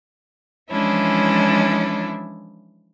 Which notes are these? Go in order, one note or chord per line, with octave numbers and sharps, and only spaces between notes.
E3 F3 G#3 C#4 D4 E4